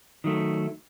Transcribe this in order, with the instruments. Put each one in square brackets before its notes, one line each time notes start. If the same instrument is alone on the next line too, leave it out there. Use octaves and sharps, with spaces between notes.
[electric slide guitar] D#3 F#3 A3